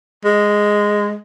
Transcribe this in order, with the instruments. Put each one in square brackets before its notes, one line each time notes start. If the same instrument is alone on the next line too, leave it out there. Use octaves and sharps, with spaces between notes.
[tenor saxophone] G#3